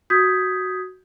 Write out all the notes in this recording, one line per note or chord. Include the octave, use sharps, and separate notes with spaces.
F#4 D#6 G6 G#6 B6